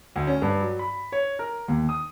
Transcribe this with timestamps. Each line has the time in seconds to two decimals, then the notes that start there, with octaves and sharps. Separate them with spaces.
0.16 D2
0.27 C#4
0.42 G2
0.61 F#3
0.79 B5
1.12 C#5
1.39 A#4
1.68 D#2
1.89 D#6